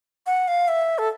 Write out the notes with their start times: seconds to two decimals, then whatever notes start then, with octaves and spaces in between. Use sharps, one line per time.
0.26 F#5
0.48 F5
0.68 E5
0.98 A4